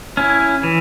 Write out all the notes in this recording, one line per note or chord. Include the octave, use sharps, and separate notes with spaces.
C#4 E4
E3